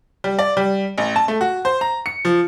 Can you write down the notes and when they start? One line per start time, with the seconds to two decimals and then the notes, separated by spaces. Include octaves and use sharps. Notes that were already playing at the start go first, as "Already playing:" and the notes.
0.24 G3
0.39 D5
0.57 G3
0.98 A1
1.16 A5
1.28 A3
1.41 F#4
1.65 C5
1.81 A#5
2.06 C#7
2.25 F3